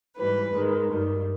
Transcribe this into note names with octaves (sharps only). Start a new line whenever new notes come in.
G#2 E3 G3 B4
G#2 D#3 G#3
G2 D#3 G3